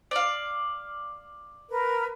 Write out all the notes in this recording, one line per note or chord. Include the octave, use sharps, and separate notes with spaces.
D5 F5
A#4 B4